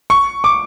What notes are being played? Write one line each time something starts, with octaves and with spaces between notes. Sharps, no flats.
C#6
D6